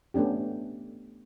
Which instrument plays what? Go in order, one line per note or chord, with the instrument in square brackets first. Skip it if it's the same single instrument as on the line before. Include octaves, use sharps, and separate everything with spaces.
[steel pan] A3 B3 C#4 D4 G4